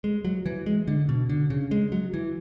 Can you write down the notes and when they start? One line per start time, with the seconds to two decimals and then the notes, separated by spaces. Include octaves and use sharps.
0.04 G#3
0.25 F#3
0.46 E3
0.66 G#3
0.88 D3
1.09 B2
1.29 D3
1.50 C#3
1.71 G#3
1.92 F#3
2.14 E3